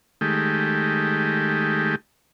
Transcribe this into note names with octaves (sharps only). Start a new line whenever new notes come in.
D#3 G#3 A3 G4